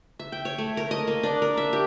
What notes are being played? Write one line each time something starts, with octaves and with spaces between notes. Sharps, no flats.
E5
G5
C#5
A3
A#4
D#5
A#3
D4
A#4
E5
G4